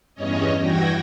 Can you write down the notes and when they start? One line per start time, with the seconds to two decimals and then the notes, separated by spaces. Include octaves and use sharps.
0.15 E2 G2 C#4 C#5 D#5
0.59 G2 E3 F#4 G5 G#6 A#6